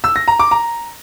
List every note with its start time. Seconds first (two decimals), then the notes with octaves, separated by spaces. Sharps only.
0.04 E6
0.16 A#6
0.28 A#5
0.39 D6
0.51 A#5